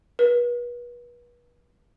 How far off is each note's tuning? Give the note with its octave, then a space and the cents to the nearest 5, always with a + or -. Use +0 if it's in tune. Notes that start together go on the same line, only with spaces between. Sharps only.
B4 -35